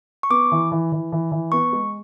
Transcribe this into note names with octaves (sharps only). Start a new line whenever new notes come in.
C#6
B3 D6
E3
E3
E3
E3
E3
B3 C#6
G#3